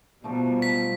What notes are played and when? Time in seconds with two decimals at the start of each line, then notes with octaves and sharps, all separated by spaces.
0.24 B2 F3 G3 A3 D#4
0.62 B6